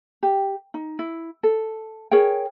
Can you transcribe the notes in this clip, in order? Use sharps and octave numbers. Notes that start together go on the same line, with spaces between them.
G4
D#4
E4
A4
G#4 A#4 C#5 G5